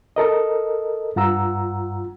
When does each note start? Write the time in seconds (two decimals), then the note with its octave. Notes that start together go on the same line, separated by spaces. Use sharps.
0.16 A4 A#4 D#5
1.16 G2 F4 F#5 A#5 E6